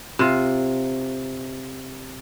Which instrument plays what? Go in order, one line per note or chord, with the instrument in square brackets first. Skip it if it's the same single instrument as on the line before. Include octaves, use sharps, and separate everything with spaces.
[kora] C3 F4